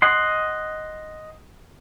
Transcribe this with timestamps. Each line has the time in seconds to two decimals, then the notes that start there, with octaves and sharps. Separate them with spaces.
0.02 D#5 F#5 C6